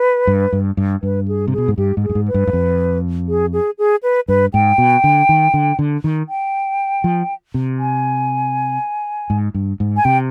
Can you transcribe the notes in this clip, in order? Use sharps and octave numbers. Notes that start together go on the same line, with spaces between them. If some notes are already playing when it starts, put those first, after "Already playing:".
Already playing: B4
G2
G2
G2
G2 B4
G#4
C3
B2 G#4
G#2
G2 G4
G#2
G#4
G2
G#2
B4
G2
G2
F2
G#4
G#4
G#4
B4
G2 B4
G#2 G5
B2
D3
D#3
D3
D3
D#3
G5
F3
C3
G#5
G#2
G2
G#2
G#5
C3 G5